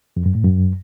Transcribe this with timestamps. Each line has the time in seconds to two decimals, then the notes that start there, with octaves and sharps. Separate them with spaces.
0.17 F2
0.26 F#2
0.35 A2
0.44 F#2